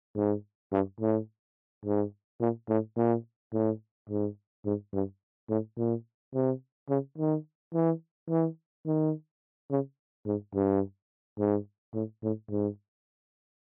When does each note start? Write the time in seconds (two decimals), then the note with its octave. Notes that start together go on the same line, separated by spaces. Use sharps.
0.16 G#2
0.72 G2
1.00 A2
1.85 G#2
2.41 A#2
2.69 A2
2.97 A#2
3.53 A2
4.10 G#2
4.65 G#2
4.93 G2
5.49 A2
5.77 A#2
6.34 C3
6.89 C#3
7.18 D#3
7.74 E3
8.29 E3
8.86 D#3
9.70 C#3
10.26 G#2
10.55 G2
11.39 G#2
11.94 A2
12.23 A2
12.50 G#2